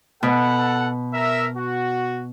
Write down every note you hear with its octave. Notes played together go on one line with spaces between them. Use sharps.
B2 A4 F#5
A#4 E5
F#4